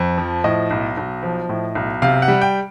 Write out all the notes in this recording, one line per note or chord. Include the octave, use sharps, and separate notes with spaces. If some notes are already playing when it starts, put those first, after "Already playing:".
Already playing: F2
F3
A2 D#5
B1
B1
F3
A2
B1
C3 F5
F#5
G3
G5